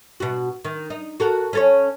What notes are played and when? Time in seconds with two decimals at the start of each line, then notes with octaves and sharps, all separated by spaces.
0.20 B2 F#4
0.65 D#3
0.90 D#4
1.20 F#4 A4 A#4
1.53 C#4 A4 C#5